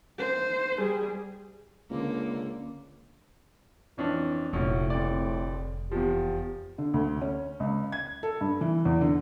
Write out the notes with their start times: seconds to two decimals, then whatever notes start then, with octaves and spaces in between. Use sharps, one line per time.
0.19 C5
0.79 G3 G#4
1.91 C#2 D3 A#3
3.98 F2 E3 C#4 D4
4.53 F1 A#1 A2 C#4 F#4
4.90 D1 F2 D5
5.91 E2 F3 G4
6.78 D3
6.94 D2
7.22 C#4
7.60 C#2
7.92 G#6
8.23 A4
8.41 G2
8.61 E3
8.85 E2
9.01 D3